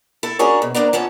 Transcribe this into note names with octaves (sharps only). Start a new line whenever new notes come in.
E4 A4
C#4 D4 F#4 G#4 A#4 C#5
B2
D2 A#3 B3 D4 A#5
F2 B3 C#4 A5